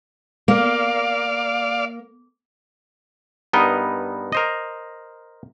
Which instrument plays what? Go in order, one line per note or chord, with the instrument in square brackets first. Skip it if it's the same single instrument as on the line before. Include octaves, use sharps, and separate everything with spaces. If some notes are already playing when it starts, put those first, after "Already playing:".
[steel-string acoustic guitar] A#3 [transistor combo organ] D5 F5
[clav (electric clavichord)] G2 B3 D#4 A#4 D#5
A#4 C5 D#5